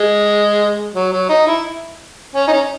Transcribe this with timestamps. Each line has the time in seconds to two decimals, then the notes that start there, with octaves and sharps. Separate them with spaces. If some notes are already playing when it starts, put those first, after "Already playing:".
Already playing: G#3
0.94 F#3
1.12 F#3
1.29 D#4
1.47 E4
2.35 C#4
2.48 D#4
2.53 C#4